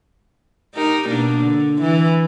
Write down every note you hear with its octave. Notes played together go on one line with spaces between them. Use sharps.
D#4 G4 A#4
B2 A#3 D4
D3
E3